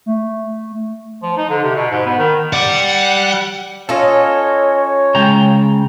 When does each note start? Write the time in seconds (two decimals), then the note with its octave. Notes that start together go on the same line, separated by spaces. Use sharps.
0.06 A3
1.22 F3
1.37 D#4
1.49 D3
1.63 C3
1.75 B2
1.91 G#2
2.06 B3
2.18 D#3
2.53 G4 D5 F#5
3.89 C#4 F4 A4 C#5 D#5
5.15 C#3 G#3 G5 A#5